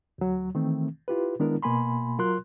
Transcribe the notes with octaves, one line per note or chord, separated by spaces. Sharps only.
D2 F#3
D#3 E3 A3 C4
E4 F4 G4 B4
D#3 G#3 B3 D4 E4 A#4
B2 A#3 G#5 B5 C6
F#3 F4 A#4 C6 F#6